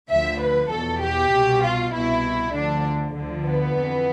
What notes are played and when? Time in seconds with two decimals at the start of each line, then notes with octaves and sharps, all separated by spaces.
0.09 D2 D3 F3 E5
0.40 B4
0.71 E2 B2 A4
1.01 G4
1.32 C2 B2
1.63 F4
1.93 C2 B2 E4
2.54 D2 D3 F3 D4
3.16 D2 D3 F3
3.46 B3
3.76 F2 E3